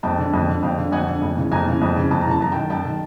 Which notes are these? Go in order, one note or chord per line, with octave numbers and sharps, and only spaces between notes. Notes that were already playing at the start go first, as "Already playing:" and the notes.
F2 G5 A5
D3
F2
D3
F2 F5 G5
D3
F2 F#5 G#5
D3
F2
C#3 E3
F2 G#5 A#5
C#3 E3
F2
C#3 E3
F2 A5
C#3 E3 A#5
A5
F#2 A#5
D#3 G5 A5
F#2 G5 A5
D#3